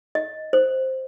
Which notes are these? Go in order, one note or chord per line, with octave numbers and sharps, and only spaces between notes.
D#5
C5